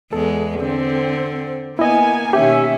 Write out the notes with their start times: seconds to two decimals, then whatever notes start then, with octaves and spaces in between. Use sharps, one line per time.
0.13 E2 G#3 A4
0.60 D3 C4
1.79 A#3 B3 E4 D#5 G#5
2.33 B2 D#3 C#4 G4 E5